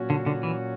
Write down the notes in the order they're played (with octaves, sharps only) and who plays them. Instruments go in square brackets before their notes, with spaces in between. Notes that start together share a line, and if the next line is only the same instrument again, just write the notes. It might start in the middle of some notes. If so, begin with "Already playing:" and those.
Already playing: [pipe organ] A#2 F#3 C#4 F#4
[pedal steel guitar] D3
D3
E3